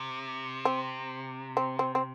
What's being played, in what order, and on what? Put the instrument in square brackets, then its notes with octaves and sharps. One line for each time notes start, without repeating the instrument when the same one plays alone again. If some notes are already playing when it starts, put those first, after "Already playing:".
Already playing: [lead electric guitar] C3
[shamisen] C4
C4
C4
C4